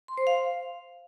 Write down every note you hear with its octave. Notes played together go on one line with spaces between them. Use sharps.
C6
C5
F5